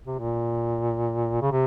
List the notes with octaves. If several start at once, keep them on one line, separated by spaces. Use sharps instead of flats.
C3
A#2
C#3
C3